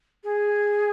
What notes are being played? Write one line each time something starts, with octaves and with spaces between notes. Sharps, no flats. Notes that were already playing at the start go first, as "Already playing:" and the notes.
G#4